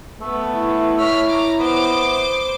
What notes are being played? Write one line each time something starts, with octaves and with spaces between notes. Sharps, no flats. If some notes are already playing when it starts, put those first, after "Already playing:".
A3 B3
E4
C#5 F6 B6
A#5 D6
B3 C5 D6